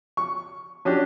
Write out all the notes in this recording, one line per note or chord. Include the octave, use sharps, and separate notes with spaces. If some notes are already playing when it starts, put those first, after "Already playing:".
C#6
C#4 D4 F#4 G4